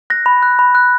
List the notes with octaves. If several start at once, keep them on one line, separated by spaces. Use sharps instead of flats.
F#6 A#6
B5
F#6
B5
F#6